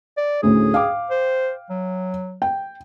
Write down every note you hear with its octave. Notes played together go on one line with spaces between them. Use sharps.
D5
D2 A2 C#4 G#4
F5 G5 D6
C5
F#3
G5